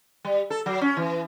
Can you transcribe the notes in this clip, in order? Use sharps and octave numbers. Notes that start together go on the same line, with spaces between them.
G3
A4
F#3
C#4
E3